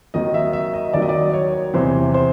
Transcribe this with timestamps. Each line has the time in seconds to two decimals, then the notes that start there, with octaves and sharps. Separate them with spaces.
0.14 D#2 D#3 F#3 D#5
0.34 E5
0.53 E5
0.74 D#5
0.93 D#2 D#3 F#3 D5
1.02 D#5
1.09 D5
1.33 C#5
1.74 E2 C3 E3 C5
2.14 C5